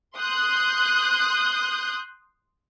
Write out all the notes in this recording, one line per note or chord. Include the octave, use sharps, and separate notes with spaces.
C6 D#6 F#6 G6